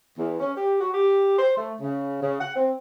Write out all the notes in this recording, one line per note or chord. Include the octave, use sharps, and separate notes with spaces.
E2
C#4
G4
F#4
G4
C5
A3
C#3
C#3
F#5
C4